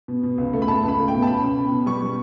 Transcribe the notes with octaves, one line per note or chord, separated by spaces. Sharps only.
B2
B2
C#2
A3
B5
C#2 A5
C#2
B5
A3
B2 G5
A5
C#4 B5
C#4
B2
B2
G3 C#6
G3